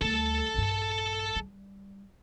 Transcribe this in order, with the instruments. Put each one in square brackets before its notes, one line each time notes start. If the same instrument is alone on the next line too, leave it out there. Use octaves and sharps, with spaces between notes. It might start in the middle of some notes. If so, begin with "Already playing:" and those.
[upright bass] D2 G3 [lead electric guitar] A4 A5
[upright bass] A#1 G2
G3